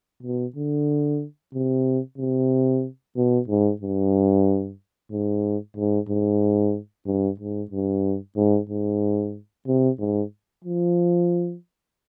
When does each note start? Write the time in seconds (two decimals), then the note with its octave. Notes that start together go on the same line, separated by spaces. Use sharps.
0.23 B2
0.56 D3
1.54 C3
2.18 C3
3.16 B2
3.48 G#2
3.82 G2
5.12 G#2
5.77 G#2
6.09 G#2
7.06 G2
7.40 G#2
7.71 G2
8.36 G#2
8.70 G#2
9.67 C3
9.99 G#2
10.64 F3